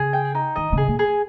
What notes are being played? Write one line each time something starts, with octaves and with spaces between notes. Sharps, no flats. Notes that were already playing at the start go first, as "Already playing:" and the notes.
Already playing: C#3 G#4
G5
D#4
D#3 D#5
C#3
G#4
A#2
G#4